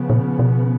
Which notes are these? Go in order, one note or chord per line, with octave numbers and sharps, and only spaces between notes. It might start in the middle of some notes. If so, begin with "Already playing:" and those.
Already playing: C#3 F3 B3
A#2
B2